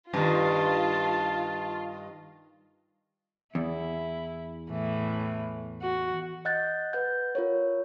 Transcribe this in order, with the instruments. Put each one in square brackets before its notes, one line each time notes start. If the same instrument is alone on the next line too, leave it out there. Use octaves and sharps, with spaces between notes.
[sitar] G2 D#3 [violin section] F4 [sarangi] A5
[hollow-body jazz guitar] E2 [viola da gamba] E4
[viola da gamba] A2 E3
F#4
[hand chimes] D#5 F#5 F#6 G6 A6
B4 F#5 G6
F4 A#4 C#5